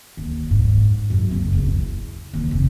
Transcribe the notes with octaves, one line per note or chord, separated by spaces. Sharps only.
D#2
G#2
F#2
F#1
E2
E4
D#2
F1